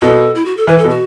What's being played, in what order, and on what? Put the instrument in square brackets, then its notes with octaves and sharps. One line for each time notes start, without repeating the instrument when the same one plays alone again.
[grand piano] B2 [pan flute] A4
[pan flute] E4
F#4
A4
[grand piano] E3 [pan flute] B4
[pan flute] A4
[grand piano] B2
[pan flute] F#4